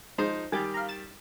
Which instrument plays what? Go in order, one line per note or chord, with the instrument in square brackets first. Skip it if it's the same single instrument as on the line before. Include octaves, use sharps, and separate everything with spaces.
[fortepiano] F3 D#4 C5 [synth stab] G#3
[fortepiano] D#3 G3 G4 [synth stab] G#5 A6
[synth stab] F5 A#5
A6 E7